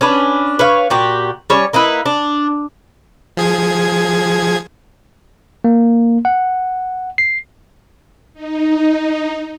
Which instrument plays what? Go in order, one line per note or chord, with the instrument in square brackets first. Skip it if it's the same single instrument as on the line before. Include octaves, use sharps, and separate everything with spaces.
[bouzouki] C#4 D4 B4
B4 C#5 F5
A#2 F#4 G4
G3 C#4 C#5
A#3 D#4 E4 B4
D4
[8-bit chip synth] F3 G#4 G#6
[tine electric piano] A#3
F#5
C7
[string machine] D#4